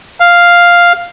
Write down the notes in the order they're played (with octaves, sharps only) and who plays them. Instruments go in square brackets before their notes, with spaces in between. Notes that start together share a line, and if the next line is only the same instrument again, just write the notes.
[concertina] F5